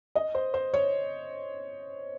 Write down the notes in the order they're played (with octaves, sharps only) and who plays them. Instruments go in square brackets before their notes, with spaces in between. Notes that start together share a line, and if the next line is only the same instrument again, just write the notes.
[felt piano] D#5
C5
C5
C#5